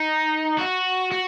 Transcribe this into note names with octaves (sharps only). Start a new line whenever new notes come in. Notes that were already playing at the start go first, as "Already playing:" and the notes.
Already playing: D#4
F#4
F#4